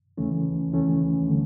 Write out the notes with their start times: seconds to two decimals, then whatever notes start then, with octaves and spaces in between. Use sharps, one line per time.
0.17 D#2 C#3 E3 A3 C#4
0.72 D#2 C#3 E3 A3 C#4
1.28 D3 G3